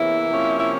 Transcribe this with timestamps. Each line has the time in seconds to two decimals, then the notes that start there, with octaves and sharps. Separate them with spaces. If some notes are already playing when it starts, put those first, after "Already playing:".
Already playing: E2 C3 E3 A#3 C#4 E4
0.30 C3 F3 A#3 C#4
0.60 E4